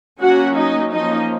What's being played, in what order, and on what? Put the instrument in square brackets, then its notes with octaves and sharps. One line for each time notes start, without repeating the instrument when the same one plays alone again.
[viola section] F#3 A#3 C#4 F#4 F#5
D#4 D#5
F3 A#3 C#4 D#4 D#5